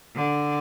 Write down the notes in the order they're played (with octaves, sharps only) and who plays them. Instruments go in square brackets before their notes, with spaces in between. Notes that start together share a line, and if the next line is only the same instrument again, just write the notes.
[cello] D3